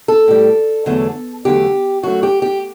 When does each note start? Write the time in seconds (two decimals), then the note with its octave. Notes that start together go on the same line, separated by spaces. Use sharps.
0.08 A4
0.28 A2 G3
0.86 E2 D3 F#3 A3
1.45 E2 D3 F#3 A3 G4
2.03 F#2 F#3 A3 F#4
2.23 G4
2.42 G4